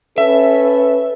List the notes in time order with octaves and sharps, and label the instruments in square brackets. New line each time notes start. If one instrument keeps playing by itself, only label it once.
[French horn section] C#4 A4 B4 [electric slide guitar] E5